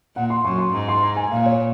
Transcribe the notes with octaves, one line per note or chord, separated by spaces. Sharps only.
A#2 F#5
C6
F#2 C#6
C6
G#2 A#5
C6
A#5
G#5
A#2 F5
C#5